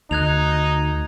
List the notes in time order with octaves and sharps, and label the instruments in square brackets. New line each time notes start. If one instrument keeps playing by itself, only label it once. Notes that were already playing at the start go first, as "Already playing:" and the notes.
[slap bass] D2 [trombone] D#4 [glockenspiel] F#6 G#6 F7